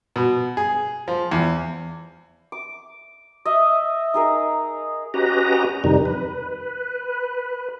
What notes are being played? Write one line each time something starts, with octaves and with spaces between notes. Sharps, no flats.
B2
G#4
F3
E2
D6
D#5 E5
D#4 G#4 A#4
C#4 F#4 G4 B4 D#5 A#5
F2 C3 D#3 G3 D#4
B4